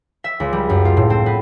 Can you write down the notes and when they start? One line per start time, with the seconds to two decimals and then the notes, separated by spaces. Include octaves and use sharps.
0.24 E5
0.40 C#2
0.53 G3
0.69 F#2
0.85 F4
0.97 A2
1.10 C4
1.26 B3